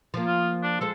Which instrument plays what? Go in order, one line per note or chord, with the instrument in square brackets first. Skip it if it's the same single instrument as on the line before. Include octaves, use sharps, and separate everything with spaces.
[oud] F3 A#3
[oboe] F4
D4
[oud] F3 G#3 C5 [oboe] A4